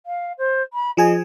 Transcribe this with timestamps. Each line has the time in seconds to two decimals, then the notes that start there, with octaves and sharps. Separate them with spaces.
0.06 F5
0.38 C5
0.73 B5
0.97 F3 G#4 D#5 G#5